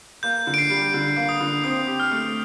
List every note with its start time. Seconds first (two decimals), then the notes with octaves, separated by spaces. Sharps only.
0.23 A#3 G6
0.47 D3
0.54 D7
0.58 C7
0.70 G3
0.94 D3 D7
1.16 A#3
1.29 D#6
1.40 D3
1.64 C4 D#6
1.87 G4
2.00 F6
2.11 A3